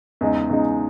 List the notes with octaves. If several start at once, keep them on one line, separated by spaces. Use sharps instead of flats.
E2 C#3 G#3 D#4
E2 C#3 G#3 D#4